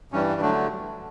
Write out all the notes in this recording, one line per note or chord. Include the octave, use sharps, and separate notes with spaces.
G2 E3 G3 C#4
D3 F#3 A3 D4